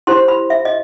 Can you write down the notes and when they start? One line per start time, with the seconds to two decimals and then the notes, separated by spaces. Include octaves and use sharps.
0.07 E4 G4 C5 C6
0.28 B5
0.50 E5
0.65 D#5